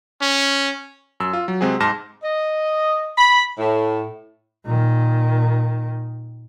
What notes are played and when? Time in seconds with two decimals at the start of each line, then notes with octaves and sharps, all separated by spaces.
0.22 C#4
1.20 F#2 E6
1.33 F4
1.48 F#3
1.61 C3 G#3 C4 F#4 G#4
1.80 G#2 A5 C6 F6 A#6 E7
2.23 D#5
3.18 B5
3.59 A2
4.65 A#2 D#3